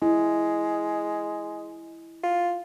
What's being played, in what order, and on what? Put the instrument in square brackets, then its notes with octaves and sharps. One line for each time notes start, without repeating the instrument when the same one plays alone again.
[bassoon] G#3 [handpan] E4
[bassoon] F4